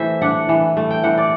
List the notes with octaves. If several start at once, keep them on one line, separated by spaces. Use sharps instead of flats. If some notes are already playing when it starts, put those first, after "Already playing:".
Already playing: E3 A3 C5 E5
D4 F#5
E3
A3
G5
E3 F#5
D5